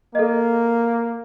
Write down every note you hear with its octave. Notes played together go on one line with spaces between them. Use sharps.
A#3 A4 D#5